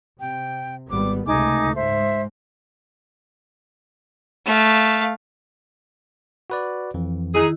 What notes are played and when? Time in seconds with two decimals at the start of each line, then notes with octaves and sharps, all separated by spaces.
0.20 C3 G5
0.90 G#1 G3 B3 D6
1.27 C#2 C3 A3 D#4 G#5 D6
1.75 G#2 C5 E5
4.46 A3 F5
6.50 F#4 B4 D5
6.94 F2 E3
7.35 D#3 D#4 E4 G#4